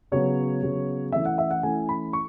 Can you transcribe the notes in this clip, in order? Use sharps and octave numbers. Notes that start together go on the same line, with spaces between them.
C#3 F#3 B3 C#5
C#3 F#3 B3
E3 A3 C#4 E4 E5
F#5
E5
F#5
E3 A3 C#4 E4 G#5
B5
C#6